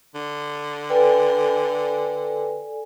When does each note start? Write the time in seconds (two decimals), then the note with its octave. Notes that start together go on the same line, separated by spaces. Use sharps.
0.15 D3
0.90 A4 B4 D5 G5 G#5